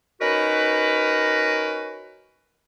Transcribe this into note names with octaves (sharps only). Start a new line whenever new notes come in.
C#4 D#4 F#4 A#4 B4